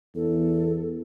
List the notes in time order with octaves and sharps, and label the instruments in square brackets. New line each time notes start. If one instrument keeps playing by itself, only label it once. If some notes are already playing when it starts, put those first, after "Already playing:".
[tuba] E2 [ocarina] A4